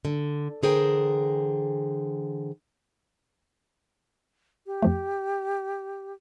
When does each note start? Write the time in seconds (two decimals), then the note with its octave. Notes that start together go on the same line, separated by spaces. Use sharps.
0.05 D3
0.63 D3 E3 G#4 A#4 C5 G5
4.66 G4
4.82 F2 F3 A3